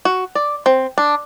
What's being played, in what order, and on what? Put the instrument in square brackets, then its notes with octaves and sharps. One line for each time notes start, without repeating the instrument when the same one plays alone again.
[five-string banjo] F#4
D5
C4
D4